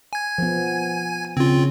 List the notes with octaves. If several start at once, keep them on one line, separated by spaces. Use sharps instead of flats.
G#5 G#6
F3 B3
C#3 C4 C#4 F4